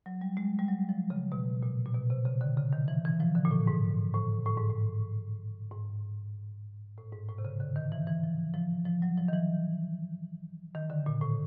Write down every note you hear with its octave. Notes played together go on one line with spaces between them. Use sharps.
F#3
G3
G#3
G3
F#3
F3
C#3
B2
A#2
A#2
B2
C3
C#3
D3
C#3
D#3
E3
E3
F3
D3
A#2
A2
G#2
A2
A2
G#2
A2
G#2
A2
G#2
A2
C3
C#3
D3
D#3
E3
E3
F3
F3
F3
F#3
F3
D#3
E3
D#3
D3
A#2
A2